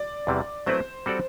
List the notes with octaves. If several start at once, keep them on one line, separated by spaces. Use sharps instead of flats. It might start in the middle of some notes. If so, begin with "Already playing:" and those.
Already playing: D5
E2 C3 E3 G3
F#3 A3 C4 E4 B4 C5
G3 C4 F#4 A4 D5